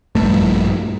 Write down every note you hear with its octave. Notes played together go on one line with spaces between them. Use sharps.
A#1 G2 A3